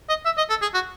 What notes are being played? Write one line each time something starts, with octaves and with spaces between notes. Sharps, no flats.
D#5
E5
D#5
A4
G#4
F#4